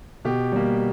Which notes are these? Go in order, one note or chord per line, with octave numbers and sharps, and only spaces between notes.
B2 G4
G3 A#3